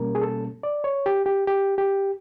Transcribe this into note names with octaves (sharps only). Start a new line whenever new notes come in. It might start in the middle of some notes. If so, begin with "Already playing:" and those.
Already playing: B2 G3 A#3 C#4 A#4
G#4
A4
D5
C#5
G4
G4
G4
G4